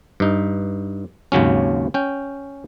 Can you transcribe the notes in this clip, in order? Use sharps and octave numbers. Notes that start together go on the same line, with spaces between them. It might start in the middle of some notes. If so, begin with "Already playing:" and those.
G2 D#4
G#1 D#2 C#3 F#3 C#4
C#4 G5